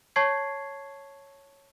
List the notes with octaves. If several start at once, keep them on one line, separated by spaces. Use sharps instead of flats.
C#5 A5 C#6 G#6 C7